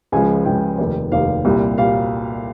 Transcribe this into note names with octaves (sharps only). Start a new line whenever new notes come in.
C#2 C#3 F3 G#3 G#5
C#2 C#3 F3 G#3 G5
F1 D#2 D#3
F1 D#2 D#3 F5
C2 A#2 G3
A#2 G3 F5